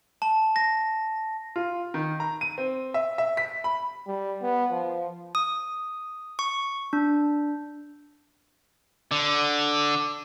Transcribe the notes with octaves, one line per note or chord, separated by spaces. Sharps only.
A5
A#6
F4
D#3
A#5
D#7
C4
E5
E5
B6
B5
G3
B3
F3
D#6
C#6
D4
D3